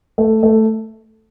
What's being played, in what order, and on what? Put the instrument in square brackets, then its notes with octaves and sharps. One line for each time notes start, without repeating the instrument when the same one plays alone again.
[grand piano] A3
A3